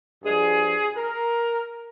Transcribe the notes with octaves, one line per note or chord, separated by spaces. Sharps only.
G2 F3 G#4
A#4